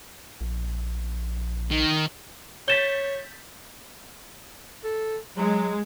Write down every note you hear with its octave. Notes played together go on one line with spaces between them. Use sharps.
A#1
D#3
C#5 G6 A6 B6 E7 G7
A4
F#3 G#3